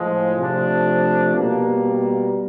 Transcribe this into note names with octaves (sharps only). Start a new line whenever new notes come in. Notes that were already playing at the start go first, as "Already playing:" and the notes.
Already playing: A2 F3 G#3
C3 F3 A3 D4
B2 G3 A#3